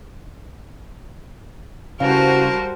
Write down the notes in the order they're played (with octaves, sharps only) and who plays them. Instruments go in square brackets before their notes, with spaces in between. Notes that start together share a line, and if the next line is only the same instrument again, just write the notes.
[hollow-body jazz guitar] C#3 E3 [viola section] G3 F#4 C5 [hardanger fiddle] A#4 A5 [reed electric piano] F5